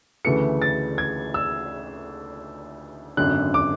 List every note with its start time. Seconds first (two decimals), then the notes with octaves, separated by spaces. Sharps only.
0.25 D2 C#3 E3 A3 C#7
0.62 A6
0.98 G#6
1.34 E6
3.17 G#1 F#2 D3 F#6
3.54 D6